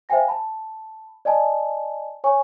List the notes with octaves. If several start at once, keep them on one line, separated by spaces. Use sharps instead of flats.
C5 E5 F5 G5 G#5 A#6
A5 B5
D5 D#5 G#5 A5
C#5 G#5 C#6